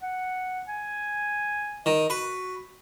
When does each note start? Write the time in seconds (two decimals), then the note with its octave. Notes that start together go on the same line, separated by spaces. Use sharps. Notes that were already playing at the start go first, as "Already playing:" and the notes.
0.02 F#5
0.68 G#5
1.86 D#3 D#5
2.10 F#4 B4